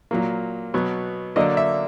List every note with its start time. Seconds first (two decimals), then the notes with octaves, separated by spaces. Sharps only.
0.11 A#2 F#3 A#3
0.74 B2 F#3 B3
1.36 D3 F#3 A#3 D4 D#5
1.57 E5